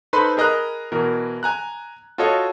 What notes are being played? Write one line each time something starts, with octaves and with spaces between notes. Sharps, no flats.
D#4 A4 B4 C5 B5 C6
G#4 A#4 D#5 A#5 B5 F#6
B2 E3 A#4
G#5 A#5 F#6
F4 F#4 A4 C#5 D#5